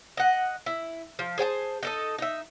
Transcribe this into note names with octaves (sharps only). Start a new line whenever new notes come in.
D#5 F#5
E4
F3
G#4 C5 G5 A5
D#4 A4 D#5
D#4 E5